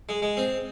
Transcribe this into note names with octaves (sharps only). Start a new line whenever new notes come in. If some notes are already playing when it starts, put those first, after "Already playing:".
G#3
G#3
C4